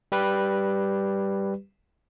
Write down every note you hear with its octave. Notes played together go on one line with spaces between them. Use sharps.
G3 G4 B4